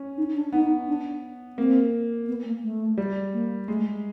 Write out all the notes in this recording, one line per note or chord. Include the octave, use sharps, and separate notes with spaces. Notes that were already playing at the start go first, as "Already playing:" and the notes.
Already playing: C#4
D#4
D4
B3 D#4
D4
A#3 C4
B3
A#3
A3
G3
A#3
G#3 A3